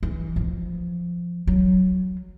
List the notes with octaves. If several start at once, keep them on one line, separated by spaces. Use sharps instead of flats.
E3
F3
F#3